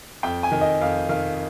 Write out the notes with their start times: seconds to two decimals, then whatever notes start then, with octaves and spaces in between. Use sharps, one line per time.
0.23 F2 G5
0.43 G#5
0.52 D#3
0.61 D#5
0.81 F2 F5
1.09 D#3 F5